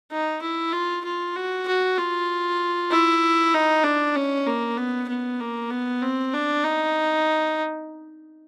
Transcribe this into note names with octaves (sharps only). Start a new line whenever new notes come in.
D#4
E4
F4
F4
F#4
F#4
F4
E4
D#4
D4
C#4
A#3
B3
B3
A#3
B3
C4
D4
D#4